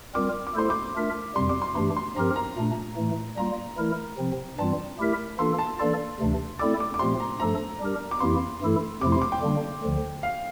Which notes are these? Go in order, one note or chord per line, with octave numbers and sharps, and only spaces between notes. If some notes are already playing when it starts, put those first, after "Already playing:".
G3 C4 F4 A#4 D6
D6
A3 E4 A4 C5 C6
D6
A3 D4 F4 A#4 E5
F2 C3 G3 C6
D6
C6
G2 E3 A3 D4 G4 C6
C6
G2 F3 C4 G4 A#4 A#5
A#5
A#2 A3 D4
A2 E3 A3
G3 A#3 F4 A#5
E3 A3 E4 A#4
C3 F3 C4
G2 E3 G3 C4 F4 A5
A3 E4 G4 A#4 E5
E3 A#3 D4 F4 A4 C6
A5
E3 A#3 D4 A4 D5 C6
D2 C3 E3 A3 D4
A3 C4 E4 A4 D5 D6
D6
D6
A#2 F3 A3 C4 G4 C6
A#5
G2 F3 A3 D4 A4 A#5
G3 D4 G4 A#4
D6
F2 E3 A#3 E4 G4 C6
G2 E3 A3 E4 A4
F2 C3 F3 A3 E4 D6
C6
D6
G5
D3 G3 A#3 D4
D2 D3 F3
F5